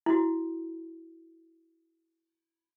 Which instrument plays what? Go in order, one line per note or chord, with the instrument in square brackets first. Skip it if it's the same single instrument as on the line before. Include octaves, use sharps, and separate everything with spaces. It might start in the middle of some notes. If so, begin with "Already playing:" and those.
[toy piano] E4 F#4